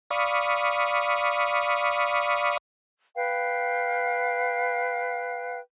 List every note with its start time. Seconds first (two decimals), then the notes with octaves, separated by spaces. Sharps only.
0.11 D5 F5 B5 C#6 D#6
3.16 B4 F5 G5